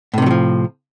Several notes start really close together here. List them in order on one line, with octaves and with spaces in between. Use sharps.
A2 C3 D#3 F#3 F3